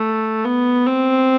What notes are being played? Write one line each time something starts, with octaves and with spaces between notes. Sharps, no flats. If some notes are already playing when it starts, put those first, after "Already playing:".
Already playing: A3
B3
C4